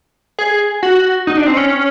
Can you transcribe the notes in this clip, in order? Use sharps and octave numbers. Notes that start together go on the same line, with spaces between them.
G#4
F#4
D#4
D4
C4
C#4